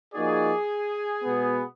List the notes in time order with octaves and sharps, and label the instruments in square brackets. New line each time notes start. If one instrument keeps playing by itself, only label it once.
[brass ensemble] F3 A#3 D#4 F#4 D5 [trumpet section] G#4
[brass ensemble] B2 G#3 B3